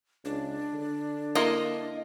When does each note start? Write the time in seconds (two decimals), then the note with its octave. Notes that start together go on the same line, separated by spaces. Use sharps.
0.25 C#2 D4
0.73 D3
1.35 A#3 E4 D#5 C6